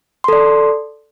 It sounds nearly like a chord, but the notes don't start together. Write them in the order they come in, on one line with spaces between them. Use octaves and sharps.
C6 A4 D5